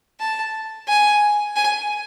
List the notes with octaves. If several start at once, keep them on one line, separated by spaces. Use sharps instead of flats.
A5
G#5
G#5